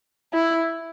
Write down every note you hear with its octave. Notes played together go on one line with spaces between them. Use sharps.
E4